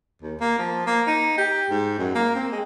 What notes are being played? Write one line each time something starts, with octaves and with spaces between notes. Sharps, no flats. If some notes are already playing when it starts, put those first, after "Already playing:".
D#2
A#3
F3
A#3
D#4
G4
G#2
F#2
A#3
C4
G#3